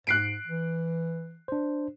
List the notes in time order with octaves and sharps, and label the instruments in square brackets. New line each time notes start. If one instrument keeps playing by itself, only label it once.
[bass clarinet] G#2 [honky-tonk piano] F#6 C7 D7
[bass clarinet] E3
[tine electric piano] D4 C5